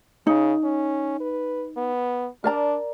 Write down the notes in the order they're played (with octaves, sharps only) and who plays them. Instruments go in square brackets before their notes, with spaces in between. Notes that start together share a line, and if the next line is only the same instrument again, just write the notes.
[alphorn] C#3 [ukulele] D#4
[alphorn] C#4
B4
B3
[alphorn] D4 [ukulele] A#4 D5 A#5